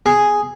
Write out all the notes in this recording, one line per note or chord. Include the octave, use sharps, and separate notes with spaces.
G#4